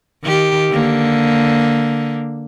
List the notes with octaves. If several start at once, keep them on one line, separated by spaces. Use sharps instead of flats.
D#3 G4
D3 A#3